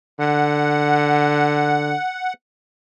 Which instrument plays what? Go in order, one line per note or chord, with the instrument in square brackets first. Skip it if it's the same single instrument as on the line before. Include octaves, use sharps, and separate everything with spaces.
[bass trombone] D3 [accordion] F#5